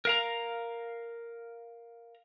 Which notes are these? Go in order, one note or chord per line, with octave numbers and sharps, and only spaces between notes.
A#4 F5 A#5